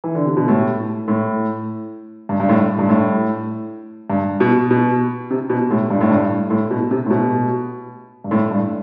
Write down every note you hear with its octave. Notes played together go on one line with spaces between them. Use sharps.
E3
D3
C3
B2
A2
A2
G2
G2
A2
G2
A2
G2
B2
B2
C3
B2
A2
G2
A2
G2
A2
B2
C3
A2
B2
G2
A2
G2